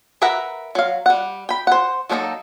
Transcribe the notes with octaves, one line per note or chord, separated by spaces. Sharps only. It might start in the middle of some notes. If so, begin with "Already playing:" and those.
A#4 B4 E5 F#5 A#5
F#3 F5
G3 F#5
G5 B5
C5 F#5
F#3 A#3 D4 D#4 A4